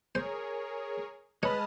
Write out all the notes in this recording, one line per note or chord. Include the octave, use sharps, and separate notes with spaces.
G#4 A#4 C5 C#5
G#3 B4 C#5 A5 B5 D#6 F6